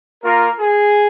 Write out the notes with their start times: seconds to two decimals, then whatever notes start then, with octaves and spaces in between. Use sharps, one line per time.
0.24 A#3 F4 A#4
0.60 G#4